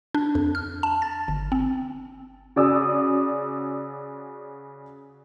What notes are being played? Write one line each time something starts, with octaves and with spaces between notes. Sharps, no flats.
D4
F2
F6
A5
A6
G1
C4
C#3 F#4 G#4 D5 D#6 E6